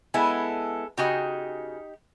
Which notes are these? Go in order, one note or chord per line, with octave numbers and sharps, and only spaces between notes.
G#3 B3 E4 A4 G#5
C#3 D#4 F#4 G4 G#5